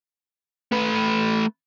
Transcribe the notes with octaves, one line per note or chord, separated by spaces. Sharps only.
A3 B4